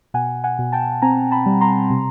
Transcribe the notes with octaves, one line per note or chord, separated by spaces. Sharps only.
B2 F#5 G#5
F#5 G#5
B2
G5 A5
C4 G#5 A#5
A5 B5
G3
A#5 C6
C3